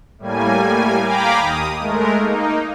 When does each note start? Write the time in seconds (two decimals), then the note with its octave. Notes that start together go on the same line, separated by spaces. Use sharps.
0.18 A2 G3 A#3 G#5
1.01 F5 G5 G#5 A#5 B5 D6
1.39 D#2 D#6
1.79 G#3 A3 A#4
2.17 A#3 D#4